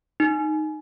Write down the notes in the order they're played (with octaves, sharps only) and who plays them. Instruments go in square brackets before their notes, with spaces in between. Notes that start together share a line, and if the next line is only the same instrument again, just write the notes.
[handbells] D#4